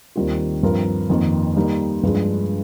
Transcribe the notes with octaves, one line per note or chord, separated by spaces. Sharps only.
D#2 D#3 G3 C4 F4
G2 F3 C4 F4 A#4
F2 D#3 A#3
G3 A#3 D#4
G2 F3 G#3 D4